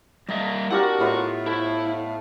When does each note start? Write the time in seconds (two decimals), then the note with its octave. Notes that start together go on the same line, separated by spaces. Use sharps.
0.29 G3 A#3 D#5 E5
0.71 C4 D4 E4 F#4 G4 A#4 F5 F#5
1.00 A2 B3 F4 D#5
1.46 A3 E4 F4 C5